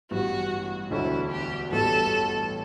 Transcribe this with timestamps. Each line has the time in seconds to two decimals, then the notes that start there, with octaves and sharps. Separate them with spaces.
0.11 A1 G2 F#3 B3 F#4
0.91 E1 D2 D3 A3 E4
1.31 G4
1.71 A1 G2 E3 B3 A4